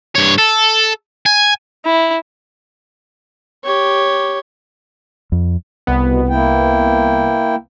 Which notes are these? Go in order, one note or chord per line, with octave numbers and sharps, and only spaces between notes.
G2 C#5
A4
G#5
E4
G4 C#5
F2
C2 B3
B2
A#3 E4 G5